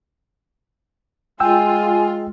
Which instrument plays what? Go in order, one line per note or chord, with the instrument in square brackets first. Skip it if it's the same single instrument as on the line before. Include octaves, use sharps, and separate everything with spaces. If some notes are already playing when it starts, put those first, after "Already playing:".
[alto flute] G#3 [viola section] F4 [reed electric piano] G5 E6 [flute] G#5